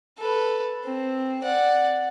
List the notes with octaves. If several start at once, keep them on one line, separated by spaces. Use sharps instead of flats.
A4 B4
C4
D5 F#5